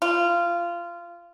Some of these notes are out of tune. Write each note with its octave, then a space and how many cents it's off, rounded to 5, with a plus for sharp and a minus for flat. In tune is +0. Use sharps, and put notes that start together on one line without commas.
F4 -20